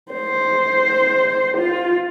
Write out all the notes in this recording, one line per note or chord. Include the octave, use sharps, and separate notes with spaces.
C5
F4